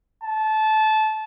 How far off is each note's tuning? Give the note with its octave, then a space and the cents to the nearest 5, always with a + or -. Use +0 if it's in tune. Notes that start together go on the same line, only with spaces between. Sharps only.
A5 -20